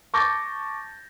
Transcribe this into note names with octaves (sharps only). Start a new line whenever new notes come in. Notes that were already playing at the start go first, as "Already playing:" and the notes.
A5 C#6 D6 G6 A6 A#6